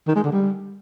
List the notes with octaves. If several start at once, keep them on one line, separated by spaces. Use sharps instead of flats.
D#3
G#3
D3
G3